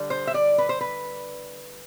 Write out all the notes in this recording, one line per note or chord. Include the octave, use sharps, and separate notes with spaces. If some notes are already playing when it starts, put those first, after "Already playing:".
Already playing: D3 G3 D4
C5
E5
D5
B4
C5
B4